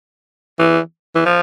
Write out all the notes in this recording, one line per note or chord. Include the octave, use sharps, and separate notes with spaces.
E3
E3
F3